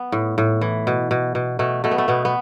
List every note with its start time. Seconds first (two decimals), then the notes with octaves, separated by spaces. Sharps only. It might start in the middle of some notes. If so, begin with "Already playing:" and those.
Already playing: B3
0.12 A2
0.38 A2
0.61 E3
0.87 B2
1.11 B2
1.35 B2
1.59 B2 A3
1.84 B2 A3
1.91 B3
1.98 A3
2.08 B2 B3
2.25 B3